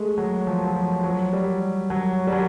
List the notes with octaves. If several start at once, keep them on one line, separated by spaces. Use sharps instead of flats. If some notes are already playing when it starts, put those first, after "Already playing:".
Already playing: G#3 A3
F#3
F3
F#3
F3
F#3
G3
F#3
G3
F#3